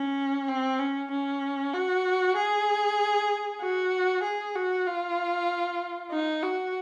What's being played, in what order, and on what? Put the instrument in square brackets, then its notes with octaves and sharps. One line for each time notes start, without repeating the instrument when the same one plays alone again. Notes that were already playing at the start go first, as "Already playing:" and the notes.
Already playing: [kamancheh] C#4
C4
C#4
C#4
F#4
G#4
F#4
G#4
F#4
F4
D#4
F#4